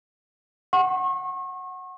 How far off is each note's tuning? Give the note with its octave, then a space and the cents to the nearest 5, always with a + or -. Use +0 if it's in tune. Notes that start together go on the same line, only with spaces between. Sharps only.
F#5 +0 C#6 -35